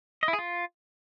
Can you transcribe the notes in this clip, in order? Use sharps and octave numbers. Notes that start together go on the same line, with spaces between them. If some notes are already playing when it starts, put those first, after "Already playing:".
D#5
E4
G#4
F4